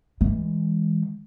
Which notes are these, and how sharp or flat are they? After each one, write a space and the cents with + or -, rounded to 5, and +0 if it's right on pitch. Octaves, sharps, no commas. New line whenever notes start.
E3 -20 G#3 -15